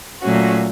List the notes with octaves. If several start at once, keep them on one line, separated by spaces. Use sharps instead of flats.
A#2 F#3 A3 C#4 F#4